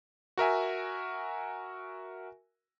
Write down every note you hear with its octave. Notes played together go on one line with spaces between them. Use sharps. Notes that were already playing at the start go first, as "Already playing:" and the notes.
F#4 A#4 E5 G#5